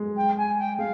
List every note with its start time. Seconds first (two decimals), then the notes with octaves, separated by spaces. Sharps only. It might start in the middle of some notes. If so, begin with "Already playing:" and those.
Already playing: G#3
0.16 G5
0.37 G#5
0.58 G5
0.78 G#3 F5